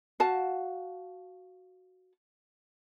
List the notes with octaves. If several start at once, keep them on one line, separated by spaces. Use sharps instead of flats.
F#4 F5 A5